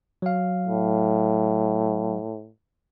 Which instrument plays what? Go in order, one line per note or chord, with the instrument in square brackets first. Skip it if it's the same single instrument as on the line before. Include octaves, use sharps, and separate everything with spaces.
[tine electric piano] F#3 F5
[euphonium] A2